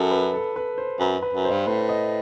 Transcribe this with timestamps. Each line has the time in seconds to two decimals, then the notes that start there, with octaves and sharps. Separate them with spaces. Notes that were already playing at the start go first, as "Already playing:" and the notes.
Already playing: F#2 A4
0.11 B4
0.34 A4
0.56 B4
0.78 C5
1.00 F#2 B4
1.22 B4
1.34 F#2
1.45 C5
1.51 G2
1.67 A2 B4
1.89 D#5